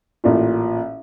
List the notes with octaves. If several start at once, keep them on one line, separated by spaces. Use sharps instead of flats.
A1 A#2